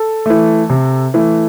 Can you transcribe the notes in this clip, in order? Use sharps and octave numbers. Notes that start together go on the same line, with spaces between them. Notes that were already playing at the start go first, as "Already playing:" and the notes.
Already playing: A4
E3 A3
C3
E3 A3